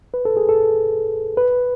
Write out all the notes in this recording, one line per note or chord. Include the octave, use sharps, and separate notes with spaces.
B4
A4
G#4
A4
B4